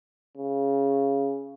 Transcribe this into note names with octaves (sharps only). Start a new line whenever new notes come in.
C#3